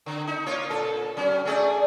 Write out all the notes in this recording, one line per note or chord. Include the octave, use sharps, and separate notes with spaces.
D3
D#4
A#3 F4 C#5
A#2 A4
F#3 C#4
A3 G#4 D5